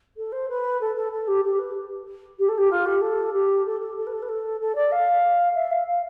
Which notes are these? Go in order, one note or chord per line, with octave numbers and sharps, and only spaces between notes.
A4
C5
B4
A4
A4
A4
G4
G4
B4
G4
A4
G4
F4
G4
A4
G4
A4
A4
A4
B4
A4
B4
A4
A4
D5
F5
E5
F5
F5